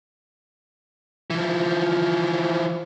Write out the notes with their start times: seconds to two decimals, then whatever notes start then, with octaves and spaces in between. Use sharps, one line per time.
1.30 E3 F3